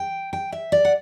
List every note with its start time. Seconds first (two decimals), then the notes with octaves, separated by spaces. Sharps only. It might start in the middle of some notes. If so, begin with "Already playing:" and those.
Already playing: G5
0.33 G5
0.52 E5
0.72 D5
0.85 F#5